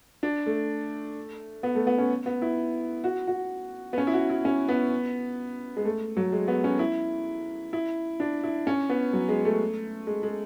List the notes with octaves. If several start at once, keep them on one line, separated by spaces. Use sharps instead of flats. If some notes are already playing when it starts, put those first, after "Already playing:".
D4
A3
B3
A3
B3
C#4
B3
E4
F#4
F#4
B3
C#4
E4
F#4
E4
C#4
B3
G#3
A3
F#3
G#3
B3
C#4
E4
E4
D4
E4
C#4
B3
F#3
G#3
A3
G#3
G#3